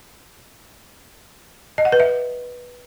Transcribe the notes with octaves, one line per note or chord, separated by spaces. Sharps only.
D#5
F#5
B4
E5